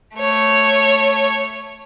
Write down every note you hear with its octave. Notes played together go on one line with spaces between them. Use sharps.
A3 C#5